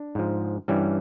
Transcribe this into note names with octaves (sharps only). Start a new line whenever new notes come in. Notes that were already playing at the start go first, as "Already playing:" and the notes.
Already playing: D4
G#2 F3
G2 E3 G3 C#4